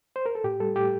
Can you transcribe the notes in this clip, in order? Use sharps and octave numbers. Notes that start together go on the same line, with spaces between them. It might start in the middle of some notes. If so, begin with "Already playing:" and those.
C5
A#4
A4
A2 G4
G3 A4
A2 G4